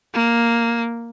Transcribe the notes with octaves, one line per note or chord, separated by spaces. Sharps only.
A#3